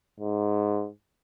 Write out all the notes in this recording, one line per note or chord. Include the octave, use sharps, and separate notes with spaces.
G#2